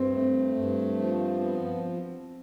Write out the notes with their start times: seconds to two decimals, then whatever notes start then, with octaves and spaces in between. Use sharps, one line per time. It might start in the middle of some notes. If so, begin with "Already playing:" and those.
Already playing: G2 C4
0.13 A3
0.56 G2
0.98 F3
1.40 B3